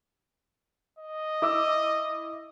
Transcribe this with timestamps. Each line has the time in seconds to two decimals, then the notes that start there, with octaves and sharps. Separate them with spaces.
0.99 D#5
1.42 E4 D6 E6